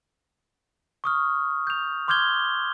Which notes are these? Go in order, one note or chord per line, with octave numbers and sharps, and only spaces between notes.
C#6 D#6 F6
G6 F7
C6 D6 F6 G6 G#6 G7